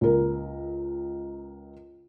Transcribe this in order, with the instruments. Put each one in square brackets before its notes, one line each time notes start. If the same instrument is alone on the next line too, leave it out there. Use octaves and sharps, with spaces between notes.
[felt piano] C#2 A#4